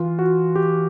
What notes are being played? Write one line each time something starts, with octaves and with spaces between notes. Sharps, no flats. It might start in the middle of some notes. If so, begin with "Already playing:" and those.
Already playing: E3 F4
F#4
G4